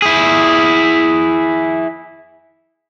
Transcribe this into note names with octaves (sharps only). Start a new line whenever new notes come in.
E4 G#4